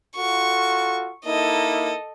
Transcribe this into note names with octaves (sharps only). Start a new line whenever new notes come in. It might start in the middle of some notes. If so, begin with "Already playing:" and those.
F4 F#4 A4 C#6
A#3 D#4 E4 A4 D#5